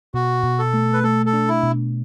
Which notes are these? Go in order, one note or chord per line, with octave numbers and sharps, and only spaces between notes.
B2 F#4
B2
A4
A3
B4
A3 A4
A4
D4
E4
B2